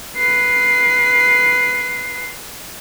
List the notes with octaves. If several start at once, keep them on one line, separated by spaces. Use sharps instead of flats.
B4 C7